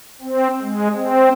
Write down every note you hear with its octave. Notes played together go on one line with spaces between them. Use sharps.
C4
G#3
C4